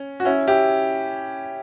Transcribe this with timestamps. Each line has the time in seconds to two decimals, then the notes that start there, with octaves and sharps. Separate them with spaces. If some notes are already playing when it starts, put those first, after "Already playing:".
Already playing: C#4
0.20 F#4
0.25 C#4 E4
0.47 E4 G4